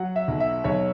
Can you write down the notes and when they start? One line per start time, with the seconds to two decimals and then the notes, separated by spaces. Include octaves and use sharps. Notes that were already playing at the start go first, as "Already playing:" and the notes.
Already playing: F#3 F#5
0.16 E5
0.28 B1
0.40 E5
0.64 B1 C#5